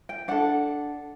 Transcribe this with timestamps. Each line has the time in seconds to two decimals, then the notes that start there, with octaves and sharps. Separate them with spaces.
0.09 G5
0.28 D4 A4 F#5